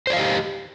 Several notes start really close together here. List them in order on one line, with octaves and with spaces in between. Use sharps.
C5 D5 F5 D#5 G4